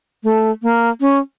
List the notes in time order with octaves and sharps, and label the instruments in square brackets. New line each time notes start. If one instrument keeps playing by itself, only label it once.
[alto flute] A3
A#3
C#4